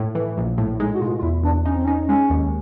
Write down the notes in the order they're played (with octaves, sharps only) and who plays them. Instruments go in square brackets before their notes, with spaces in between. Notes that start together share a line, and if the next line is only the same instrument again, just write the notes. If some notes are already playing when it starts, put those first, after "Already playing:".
Already playing: [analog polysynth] A2
E3
A#1
A2
[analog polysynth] G#3 [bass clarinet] D#4
[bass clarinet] F#4
[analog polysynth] B2 [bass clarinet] F4
[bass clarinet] F4
[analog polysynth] E2 [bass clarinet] E4
[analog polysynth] E2 [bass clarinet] D4
[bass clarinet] C#4 [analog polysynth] D#4
[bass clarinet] C4
[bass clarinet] C#4 [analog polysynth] D#4
[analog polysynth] G#3 [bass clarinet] C#4
[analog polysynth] D#2